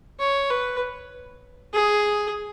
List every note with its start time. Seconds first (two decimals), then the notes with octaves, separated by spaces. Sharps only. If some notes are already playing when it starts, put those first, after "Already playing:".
0.19 C#5
0.50 B4
1.74 G#4